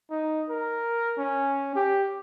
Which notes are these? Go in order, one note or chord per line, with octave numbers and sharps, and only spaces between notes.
D#4
A#4
C#4
G4